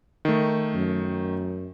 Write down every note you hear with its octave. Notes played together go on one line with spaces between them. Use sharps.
D#3 A3
F#2